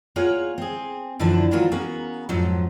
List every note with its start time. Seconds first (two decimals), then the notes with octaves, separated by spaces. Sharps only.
0.16 A#3 F4 G#4 C#5 F#5
0.58 C4 G#4
1.19 F#2 D3 E3 F3 D4 E4
1.51 E3 F#3 A#3 C4 F4 F#4
1.71 A#3 B3 C#4 F#4 G#4 A#4
2.29 F2 G#2 F3 F#3